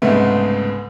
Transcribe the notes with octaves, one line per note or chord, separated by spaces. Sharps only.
C2 G#2 C#3 G#3 A3 B3